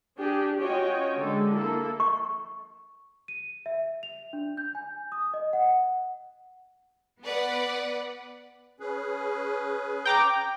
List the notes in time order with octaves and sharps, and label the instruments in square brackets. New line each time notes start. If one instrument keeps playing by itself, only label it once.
[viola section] D4 G4 G#4
C#4 F4 F#4 C#5 D#5 G5
D3 G#3 A4
A#3 E4 A4
[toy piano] A#5 C#6
[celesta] D#7
E5
F7
D4
G6
G#5
D#6
D#5
F#5
[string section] B3 B4 D5 F#5
[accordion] C#4 G#4 B4
[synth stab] G5 A#5 D6